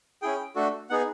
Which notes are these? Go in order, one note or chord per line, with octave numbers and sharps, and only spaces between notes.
C#4 E4 G#4 G5
A3 D4 F#4 A4
B3 D#4 G#4 F#5